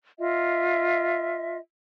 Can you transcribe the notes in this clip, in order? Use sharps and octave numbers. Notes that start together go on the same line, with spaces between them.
F4 D#5 E5